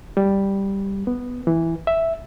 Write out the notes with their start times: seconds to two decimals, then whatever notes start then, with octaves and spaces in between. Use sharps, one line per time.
0.17 G3
1.07 B3
1.47 E3
1.87 E5